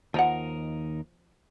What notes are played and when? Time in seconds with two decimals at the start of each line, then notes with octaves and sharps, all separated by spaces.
0.14 D#2 F3 D#4 A#4 F#5